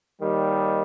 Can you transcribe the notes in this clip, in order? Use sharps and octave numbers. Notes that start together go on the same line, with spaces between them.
D#2 D#3 G3